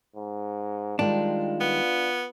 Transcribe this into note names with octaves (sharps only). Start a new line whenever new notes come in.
G#2
D#3 G3 G#3 D4 F4
B3